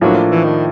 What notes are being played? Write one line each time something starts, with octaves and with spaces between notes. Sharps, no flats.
A2 F3 F#3 A#3 D4
E3
D#3